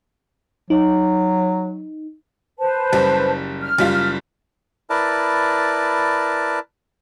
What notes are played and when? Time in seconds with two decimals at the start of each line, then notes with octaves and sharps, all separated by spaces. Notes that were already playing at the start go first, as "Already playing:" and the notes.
0.70 F#3 D#4
2.59 B4 C5 A5
2.92 F#1 G3
3.62 F6
3.78 F#1 G3 F4
4.90 E4 A#4 B4 D5 A5